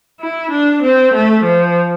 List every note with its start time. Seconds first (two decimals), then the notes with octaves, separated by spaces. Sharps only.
0.21 E4
0.51 D4
0.83 C4
1.14 A3
1.44 F3